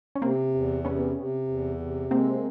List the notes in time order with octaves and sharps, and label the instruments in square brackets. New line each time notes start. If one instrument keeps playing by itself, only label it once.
[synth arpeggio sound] C#4
[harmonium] C3 [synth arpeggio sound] A#3 C4
[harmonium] E2
[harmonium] C3 [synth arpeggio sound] B3 C#4
[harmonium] C3
E2
C3
[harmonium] G#3 [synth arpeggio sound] A#3 C4